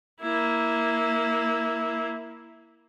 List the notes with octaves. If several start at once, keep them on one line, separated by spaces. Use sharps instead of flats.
A#3 E4